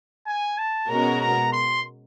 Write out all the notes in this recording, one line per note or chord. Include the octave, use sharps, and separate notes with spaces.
G#5
A5
B2 G#3 C#4 F#4 A#4 A#5
A#5
C6